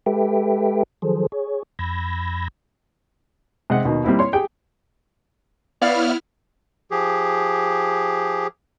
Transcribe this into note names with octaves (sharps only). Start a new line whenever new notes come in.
G#3 G4 A4 B4 E5 G5
D#3 F3 F#3 G#4 A4 C5
G#4 C#5
F2 B5 E6 G6 G#6 A#6
C3 G#3 D#5 F#5
D#2 B2 D#3
G3 A#3 C4 E4
C#5 C6
G4 G#4 G5
B3 E4 C#5 D5 F5 F6
F3 G4 G#4